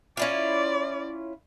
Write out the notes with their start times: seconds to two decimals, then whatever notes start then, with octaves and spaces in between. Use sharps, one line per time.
0.17 C#4 E4 F4 D5